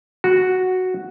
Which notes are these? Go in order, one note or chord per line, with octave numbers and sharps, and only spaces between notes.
F#4